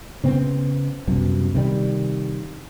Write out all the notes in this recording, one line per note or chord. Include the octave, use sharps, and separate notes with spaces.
C#3 B3 C4
C2 F#2 B2
C3 D#3 G3